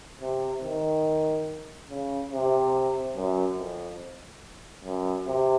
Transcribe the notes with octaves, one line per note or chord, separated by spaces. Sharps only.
C3
D#3
C#3
C3
F#2
F2
F#2
C3